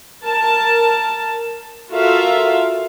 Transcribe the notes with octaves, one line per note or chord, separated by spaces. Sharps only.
A#4 A5
F4 F#4 A4 A#4 E5 F5